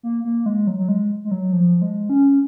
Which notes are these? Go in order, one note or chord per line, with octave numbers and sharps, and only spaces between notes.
A#3
A#3
G#3
F#3
F#3
G#3
G#3
F#3
F3
G#3
C#4